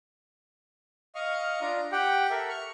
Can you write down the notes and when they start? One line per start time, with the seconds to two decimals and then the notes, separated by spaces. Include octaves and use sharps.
1.15 D#5 F5 C#6 F6
1.61 D4 F4 A#5
1.92 G4 F#5 G5
2.30 A4 A#4 E5
2.49 C#6 F6